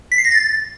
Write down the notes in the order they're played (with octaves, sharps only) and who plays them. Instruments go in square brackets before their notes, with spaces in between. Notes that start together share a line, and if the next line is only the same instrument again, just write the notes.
[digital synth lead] B6
C7
A#6
A6